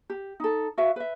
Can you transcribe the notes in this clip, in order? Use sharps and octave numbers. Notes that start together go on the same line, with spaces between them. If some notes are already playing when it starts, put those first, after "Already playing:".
G4
D#4 A4
F#4 B4 E5 F5
B4 E5